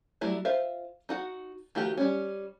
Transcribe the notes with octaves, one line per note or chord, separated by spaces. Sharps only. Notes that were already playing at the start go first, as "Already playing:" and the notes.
F#3 G3 A3 E4
F4 C5 E5 F5
D#4 F#4 F#5
D#3 F3 A3 F#4 G4
G3 C#4